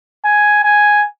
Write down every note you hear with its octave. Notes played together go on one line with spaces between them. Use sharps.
G#5
G#5